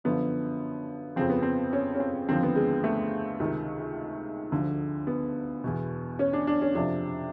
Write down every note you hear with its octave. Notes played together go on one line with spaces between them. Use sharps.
F#2 D3 F3 B3
F2 C#3 F3 C4
B3
C4
C#4
C#4
C4
D#2 D3 F3 C4
B3
G#3
A3
C#2 C3 D#3
D2 D3 F3
B3
E2 B2
C#4
D4
D4
C#4
F2 C3 F3 D4